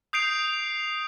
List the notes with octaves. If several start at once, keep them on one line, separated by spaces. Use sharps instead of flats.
D#6 G6 C7 D7 F7